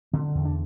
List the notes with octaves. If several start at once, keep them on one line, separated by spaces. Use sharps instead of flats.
D3 C4
E2
D4